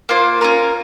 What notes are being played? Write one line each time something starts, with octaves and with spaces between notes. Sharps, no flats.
A#3 F4 C5
C#4 F4 A#4